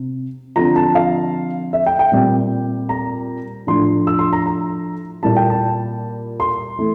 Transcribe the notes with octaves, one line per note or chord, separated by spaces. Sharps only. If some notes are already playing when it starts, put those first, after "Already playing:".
Already playing: C3
D3 F3 C4 F4 A#5
A5
F5
E5
G5
G5
A#2 G3 C4
A#5
A2 F3 A3 D4 C6
E6
C6
A#5
A#5
A#2 G3 A#3 E4 A5
G5
A5
C6
E3 A3